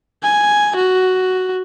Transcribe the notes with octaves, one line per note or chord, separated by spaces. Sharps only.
G#5
F#4